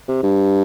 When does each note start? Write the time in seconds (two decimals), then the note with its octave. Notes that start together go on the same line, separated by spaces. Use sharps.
0.08 C3
0.23 G2